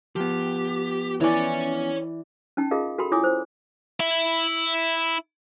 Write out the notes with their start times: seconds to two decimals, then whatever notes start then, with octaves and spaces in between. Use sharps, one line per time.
0.16 F3 B3 G4
1.21 E3 C#5 D5 G#5
2.57 C#4 D#4 G5 A5
2.71 F4 G#4 A#4 D#5 F5
2.98 F#4 A4 A#4 G5 B5 C6
3.12 E4 F4 C#5 G#5 D6 D#6
3.24 C5
4.00 E4 E5